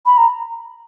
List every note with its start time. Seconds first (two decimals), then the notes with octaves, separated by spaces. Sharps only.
0.05 B5
0.17 A#5